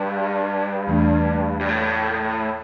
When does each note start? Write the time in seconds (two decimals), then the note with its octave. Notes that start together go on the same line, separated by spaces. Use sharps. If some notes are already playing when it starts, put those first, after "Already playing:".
Already playing: G2
0.87 E2 E3 A3 D4
1.60 G2
1.69 A2